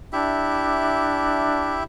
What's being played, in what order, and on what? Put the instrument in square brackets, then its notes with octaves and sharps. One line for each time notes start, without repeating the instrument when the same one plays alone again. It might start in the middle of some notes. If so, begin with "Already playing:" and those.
[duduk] D4 [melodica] E4 G4 E5